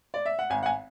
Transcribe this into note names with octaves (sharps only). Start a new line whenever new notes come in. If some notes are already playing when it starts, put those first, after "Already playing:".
D5
E5
F#5
G#1 G#5
F#5
G#5